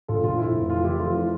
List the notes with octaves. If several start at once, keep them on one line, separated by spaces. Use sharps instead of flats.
A#1 F4 A4
A#1 F4
F2 E4
F1
E3 F4
F1 E4 G4
F2 F4
E3 F4